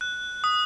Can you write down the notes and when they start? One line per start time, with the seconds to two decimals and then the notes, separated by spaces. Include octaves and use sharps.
0.01 F#6
0.44 D#6